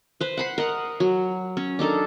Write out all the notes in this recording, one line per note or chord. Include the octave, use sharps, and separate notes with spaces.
B4 C5
F#5 B5 C6
A#4 D#5 F#5
F#3
C#4
D4 D#4 A4 A#4